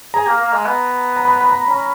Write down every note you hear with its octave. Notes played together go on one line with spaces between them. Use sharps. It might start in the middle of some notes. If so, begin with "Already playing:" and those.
G#4 A#5
A#3
A#3
G#3
B3
A#5
B5
A#5
B5
A#5
C#4 A#5